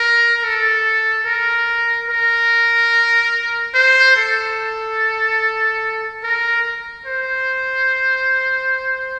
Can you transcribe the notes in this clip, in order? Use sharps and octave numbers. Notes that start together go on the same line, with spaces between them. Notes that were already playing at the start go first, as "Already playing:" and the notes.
Already playing: A#4
A4
A#4
A#4
C5
A4
A#4
C5